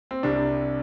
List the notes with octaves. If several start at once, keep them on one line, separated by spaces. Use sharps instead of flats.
C4
C2 C3 G3 D4